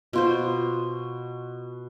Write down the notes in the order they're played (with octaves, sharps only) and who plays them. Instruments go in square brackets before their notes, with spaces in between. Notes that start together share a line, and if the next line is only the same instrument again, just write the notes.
[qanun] B2 F4 C5